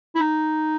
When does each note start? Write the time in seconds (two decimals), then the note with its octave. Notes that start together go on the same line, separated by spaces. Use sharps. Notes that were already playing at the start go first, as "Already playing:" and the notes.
0.15 E4
0.20 D#4